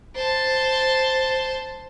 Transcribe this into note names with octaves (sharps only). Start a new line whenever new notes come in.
C5 A5